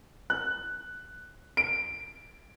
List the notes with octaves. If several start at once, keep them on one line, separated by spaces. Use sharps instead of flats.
F#6
D7